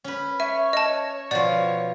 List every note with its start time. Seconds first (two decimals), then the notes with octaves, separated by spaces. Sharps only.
0.04 C#4 B4
0.40 C#5 E5
0.73 D#5 A5
1.31 B2 F3 D5